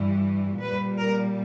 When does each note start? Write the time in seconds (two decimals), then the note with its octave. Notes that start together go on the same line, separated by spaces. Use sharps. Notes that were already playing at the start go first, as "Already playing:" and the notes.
Already playing: G2 E3 G3
0.60 A#2 G3 B4
0.99 A#4